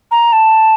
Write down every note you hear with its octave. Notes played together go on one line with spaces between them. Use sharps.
A#5
A5